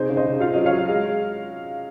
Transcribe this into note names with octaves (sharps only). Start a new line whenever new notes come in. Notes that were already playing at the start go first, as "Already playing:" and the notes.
Already playing: C3 D#4 G#4 C5
C#3
C5 D#5
C#3
F4 F5
F#3 D#5
C#5 F5
F#3
G#3